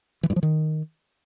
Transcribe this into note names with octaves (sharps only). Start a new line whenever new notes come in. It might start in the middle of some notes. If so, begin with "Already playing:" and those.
E3
G2
F3
D#3